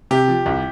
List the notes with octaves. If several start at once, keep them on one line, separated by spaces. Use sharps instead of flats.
C3 G4
F3
C2